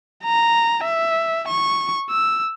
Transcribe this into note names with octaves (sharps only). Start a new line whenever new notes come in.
A#5
E5
C#6
E6